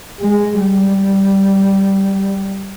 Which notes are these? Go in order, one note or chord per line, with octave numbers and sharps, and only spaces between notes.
G#3
G3